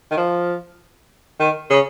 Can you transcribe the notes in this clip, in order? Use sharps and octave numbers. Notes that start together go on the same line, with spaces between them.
D#3
F3
D#3
C#3